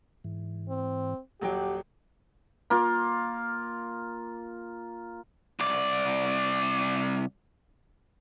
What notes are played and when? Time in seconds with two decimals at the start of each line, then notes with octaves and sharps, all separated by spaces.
0.24 G#2 E3
0.68 C4
1.41 D#1 F#3 G4 F#5 G5
2.70 A#3 F4
5.60 C2 D5